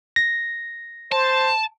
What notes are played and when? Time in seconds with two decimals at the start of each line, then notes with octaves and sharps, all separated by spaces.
0.16 A#6
1.12 C5 A5